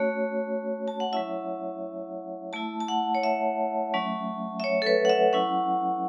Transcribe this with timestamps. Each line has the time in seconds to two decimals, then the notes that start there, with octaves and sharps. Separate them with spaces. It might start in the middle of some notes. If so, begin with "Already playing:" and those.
Already playing: A3 C#4 F#4 C#5
0.88 A5
1.00 F#5
1.13 F#3 C#4 E4 E5
2.53 A3 E4 A5
2.80 A5
2.88 F#5
3.15 C#5
3.23 E5
3.94 F#3 A3 C#4
4.60 E5
4.64 C#5
4.82 A4
4.86 B4
5.05 F#5
5.10 E5
5.33 F#3 C#4 E4 F#5